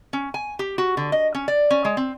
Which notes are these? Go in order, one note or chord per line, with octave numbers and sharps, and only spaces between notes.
C#4
G#5
G4
F#4
D3
D#5
C#4
D5
C#4
G#3
C4